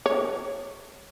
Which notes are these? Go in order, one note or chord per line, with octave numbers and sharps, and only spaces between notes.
C#5